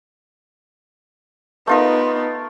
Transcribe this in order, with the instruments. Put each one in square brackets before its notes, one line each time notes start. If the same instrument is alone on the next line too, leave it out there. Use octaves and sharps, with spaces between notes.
[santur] A3 F4 A#4 [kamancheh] B3 D#4